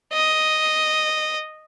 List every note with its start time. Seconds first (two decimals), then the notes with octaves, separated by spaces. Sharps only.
0.13 D#5